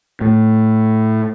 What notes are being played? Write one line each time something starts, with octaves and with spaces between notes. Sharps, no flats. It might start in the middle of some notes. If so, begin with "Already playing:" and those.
A2